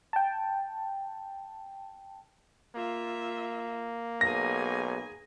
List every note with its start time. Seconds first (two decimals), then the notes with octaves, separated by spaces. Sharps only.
0.13 G5 A5
2.75 A#3 F4 E5
4.21 B1 G#4 G#5 A#6